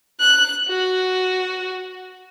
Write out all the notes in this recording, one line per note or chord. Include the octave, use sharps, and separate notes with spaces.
F#6
F#4